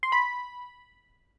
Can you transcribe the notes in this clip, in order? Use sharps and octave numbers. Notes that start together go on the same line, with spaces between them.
C6
B5